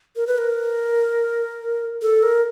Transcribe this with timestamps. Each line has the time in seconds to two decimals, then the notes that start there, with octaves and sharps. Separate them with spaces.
0.16 A#4
0.27 B4
0.38 A#4
2.02 A4
2.23 A#4